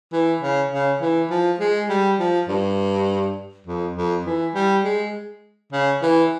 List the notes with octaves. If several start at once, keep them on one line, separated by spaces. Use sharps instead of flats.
E3
C#3
C#3
E3
F3
G#3
G3
F3
G2
F2
F2
E3
G3
G#3
C#3
E3